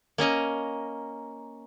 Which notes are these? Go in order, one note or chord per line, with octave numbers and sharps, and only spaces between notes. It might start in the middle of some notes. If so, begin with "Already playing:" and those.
A#3 C#4 D#5 A#5